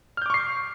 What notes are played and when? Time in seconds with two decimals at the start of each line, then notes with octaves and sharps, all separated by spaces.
0.17 F6
0.22 G6
0.26 D6
0.30 C#6
0.34 C7